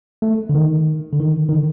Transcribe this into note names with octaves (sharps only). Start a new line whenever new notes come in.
A3
D3
D#3
D3
D#3
D#3
D3